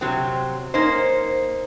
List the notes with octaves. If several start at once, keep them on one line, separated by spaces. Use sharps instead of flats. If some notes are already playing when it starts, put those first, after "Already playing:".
C3 F#3 C4
A#3 C#4 D#4 C5